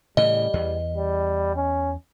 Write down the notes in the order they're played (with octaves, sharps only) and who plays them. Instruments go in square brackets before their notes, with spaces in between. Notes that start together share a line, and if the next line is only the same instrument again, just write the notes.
[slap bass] A2 C#3 E3 [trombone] G3 [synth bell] D#5
[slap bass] E2
[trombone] G3
C#4